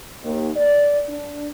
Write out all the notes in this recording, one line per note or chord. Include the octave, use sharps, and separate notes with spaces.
D#2
D5
D4